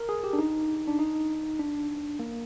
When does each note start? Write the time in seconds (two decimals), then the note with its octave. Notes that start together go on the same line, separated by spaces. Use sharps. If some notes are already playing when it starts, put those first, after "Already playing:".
Already playing: A#4
0.09 G#4
0.24 G4
0.33 D4
0.39 D#4
0.87 D4
0.99 D#4
1.59 D4
2.19 A#3